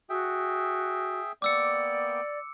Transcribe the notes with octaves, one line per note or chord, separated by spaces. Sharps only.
F#4 G#4 E5 G5
A#3 B3 D5 G5 D6 E6 C#7